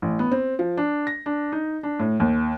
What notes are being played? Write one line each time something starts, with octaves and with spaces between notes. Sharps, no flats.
A1
B3
C4
F3
D4
A#6
D4
D#4
D4
A2
D#2